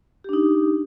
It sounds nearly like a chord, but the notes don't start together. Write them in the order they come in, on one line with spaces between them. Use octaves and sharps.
G4 D4 D#4